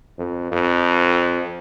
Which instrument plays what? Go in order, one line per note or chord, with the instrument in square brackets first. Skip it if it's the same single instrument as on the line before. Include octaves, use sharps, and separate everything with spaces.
[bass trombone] F2
F2